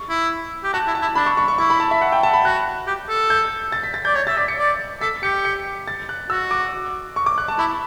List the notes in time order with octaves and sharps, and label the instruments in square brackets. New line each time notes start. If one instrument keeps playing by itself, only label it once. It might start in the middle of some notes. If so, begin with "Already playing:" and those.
Already playing: [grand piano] C#6
[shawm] E4
G4
[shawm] F#4 [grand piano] A5
[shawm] E4
[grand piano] A5
[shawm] E4
[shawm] D4 [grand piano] B5
[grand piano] C#6
C#6
C#6
[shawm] E4 [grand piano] C#6
[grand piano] B5
A5
E5
F#5
G5
A5
B5
[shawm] F#4 [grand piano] F#6
[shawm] G4
A4
[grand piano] G6
A6
B6
A6
[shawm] D5 [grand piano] G6
[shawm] C#5 [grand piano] G6
[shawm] E5 [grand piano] A6
[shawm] D5 [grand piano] B6
[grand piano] C#7
[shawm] D5
[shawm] A4 [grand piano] B6
[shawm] G4 [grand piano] C#7
[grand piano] C#7
A6
F#6
[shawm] F#4 [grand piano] E6
[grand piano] D6
C#6
D6
F#6
A5
[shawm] E4 [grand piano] B5